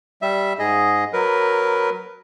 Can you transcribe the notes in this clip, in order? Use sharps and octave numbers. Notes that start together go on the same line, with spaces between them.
G3 E5
G#2 G#4 D#5
F#3 A#4 B4